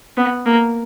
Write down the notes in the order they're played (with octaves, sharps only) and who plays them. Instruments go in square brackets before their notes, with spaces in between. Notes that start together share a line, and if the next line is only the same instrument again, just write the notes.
[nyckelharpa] B3
A#3